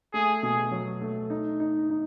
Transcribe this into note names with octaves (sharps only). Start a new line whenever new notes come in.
A3 G#4
B2 G#4
F#3
A3
D#4
D#4
D#4